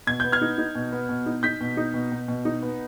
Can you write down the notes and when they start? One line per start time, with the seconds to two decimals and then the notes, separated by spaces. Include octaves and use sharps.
0.07 B2 G#6
0.20 B3 G6
0.32 F6 G#6
0.41 D#4
0.58 D#4
0.75 B2
0.92 B3
1.09 B2
1.26 D#4
1.43 D#4 G6 B6
1.61 B2
1.77 D#4
1.94 B2
2.12 B2
2.28 B2
2.45 D#4
2.63 B3